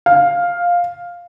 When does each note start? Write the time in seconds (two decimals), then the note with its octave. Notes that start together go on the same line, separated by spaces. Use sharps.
0.06 F5